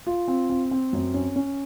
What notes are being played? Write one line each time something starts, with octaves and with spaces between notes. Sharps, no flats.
F4
C4
C4
C4
F#2
C#4
C#4